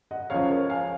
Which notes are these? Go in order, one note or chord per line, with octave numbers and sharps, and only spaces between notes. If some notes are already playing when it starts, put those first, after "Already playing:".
D#5 F#5
C#2 C#3 F3 C#5 F5
A#4 C#5
F5 G#5